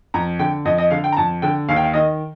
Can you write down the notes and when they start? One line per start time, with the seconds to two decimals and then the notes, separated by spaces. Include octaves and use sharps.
0.14 F2 A#5
0.39 D3 G5
0.65 F2 D#5
0.78 D#5
0.91 D3 F5
1.04 G5
1.12 A#5
1.17 F2 A5
1.42 D3 G5
1.69 D#2 F5
1.76 G5
1.84 F5
1.94 D#3 D#5